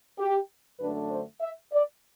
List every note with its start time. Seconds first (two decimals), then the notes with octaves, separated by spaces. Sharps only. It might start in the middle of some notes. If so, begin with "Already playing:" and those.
0.18 G4
0.79 F#2 D3 A3 D4 B4
1.10 C5
1.41 E5
1.72 D5